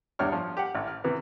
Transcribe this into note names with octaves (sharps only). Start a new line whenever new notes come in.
E2 G3 D4 C#5 F6
F3
G4 F#5
A1
F6
C3 E3 B3